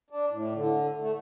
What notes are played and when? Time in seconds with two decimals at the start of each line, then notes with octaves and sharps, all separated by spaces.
0.10 D4
0.31 A2
0.54 D3
1.00 A3